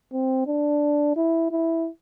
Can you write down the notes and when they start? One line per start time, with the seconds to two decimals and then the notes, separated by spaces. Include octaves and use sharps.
0.13 C4
0.47 D4
1.16 E4
1.51 E4